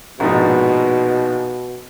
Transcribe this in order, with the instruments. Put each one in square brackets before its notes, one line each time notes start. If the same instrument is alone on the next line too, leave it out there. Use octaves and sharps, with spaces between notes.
[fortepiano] A#1 G#2 [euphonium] B2